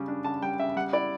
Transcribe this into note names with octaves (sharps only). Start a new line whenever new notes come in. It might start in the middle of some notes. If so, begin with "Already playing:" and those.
Already playing: C#3 G3
D4
C#3 A5
G3 G5
C#3 E5
G3 F#5
E4 D5